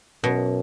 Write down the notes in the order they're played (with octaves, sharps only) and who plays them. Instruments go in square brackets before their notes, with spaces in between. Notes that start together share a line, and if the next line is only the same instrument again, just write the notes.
[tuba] F#2 [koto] B2